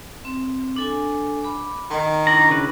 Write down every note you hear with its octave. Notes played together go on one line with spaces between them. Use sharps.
C4
D4 A4 G#5
B5 D6
D#3 D#5
D4 E4 A#5 C#6
C#3 B4